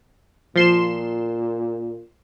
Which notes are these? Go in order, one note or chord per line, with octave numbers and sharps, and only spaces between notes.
A#2 F3 C6 E7